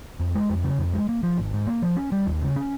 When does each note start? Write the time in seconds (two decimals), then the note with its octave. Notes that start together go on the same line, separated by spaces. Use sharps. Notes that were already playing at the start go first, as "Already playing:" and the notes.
0.20 F2
0.35 G#3
0.50 F2
0.64 C#3
0.79 F2
0.93 G#3
1.09 A#3
1.23 F3
1.38 G#1
1.53 G#2
1.67 A#3
1.82 F3
1.97 C#4
2.12 G3
2.27 D#2
2.42 C#3
2.56 C#4